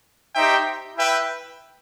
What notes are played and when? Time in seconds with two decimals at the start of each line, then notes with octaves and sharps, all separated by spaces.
0.35 D#4 G4 C5 E5 G5
0.96 E4 B4 E5 G5